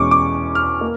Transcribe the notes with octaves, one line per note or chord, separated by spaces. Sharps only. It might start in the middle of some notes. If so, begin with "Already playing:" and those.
Already playing: E2 B2 G#3 C#4 C#6 D6
D6
F6
A#3